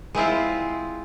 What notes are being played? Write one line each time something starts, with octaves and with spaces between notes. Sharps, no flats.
G#3 C4 E4 F4